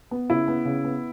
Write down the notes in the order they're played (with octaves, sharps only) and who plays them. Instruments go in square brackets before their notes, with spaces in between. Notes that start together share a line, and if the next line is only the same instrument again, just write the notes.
[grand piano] B3
[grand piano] C#3 [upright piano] E4
[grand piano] B3
C#3
B3